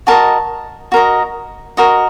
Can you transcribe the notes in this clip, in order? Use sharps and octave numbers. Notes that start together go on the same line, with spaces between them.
F#4 A#4 D#5 A5
F#4 A#4 D#5
F#4 A#4 D#5